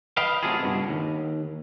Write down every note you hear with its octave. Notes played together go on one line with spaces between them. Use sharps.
B4 D#5 F5 G5
C3 F#3 A3 F4 G#4
C#2 G2 B2
D#2